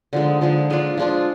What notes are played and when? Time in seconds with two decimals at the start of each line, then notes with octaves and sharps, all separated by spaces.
0.13 D3 F3 G#3 D#4
0.41 D3 F3 G#3 D#4
0.70 F3 G#3 D4 F4
0.98 F3 G#3 D4 F4